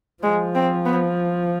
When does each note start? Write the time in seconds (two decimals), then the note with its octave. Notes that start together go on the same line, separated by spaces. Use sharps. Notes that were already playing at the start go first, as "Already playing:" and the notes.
0.23 F3 G#3
0.55 C4
0.85 B3